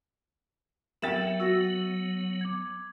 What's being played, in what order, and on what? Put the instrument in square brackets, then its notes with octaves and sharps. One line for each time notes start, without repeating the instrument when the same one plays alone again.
[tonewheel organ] F#3 B3 [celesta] A#4 E5 E6 [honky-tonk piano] G5 A6 E7
[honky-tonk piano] F#4 [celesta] E6 A6 A#6
[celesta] D6 G#6